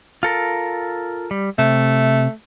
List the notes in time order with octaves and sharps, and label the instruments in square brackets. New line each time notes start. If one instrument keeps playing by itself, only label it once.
[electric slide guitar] F4 A4 A#4
G3
[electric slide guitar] C3 [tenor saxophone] A3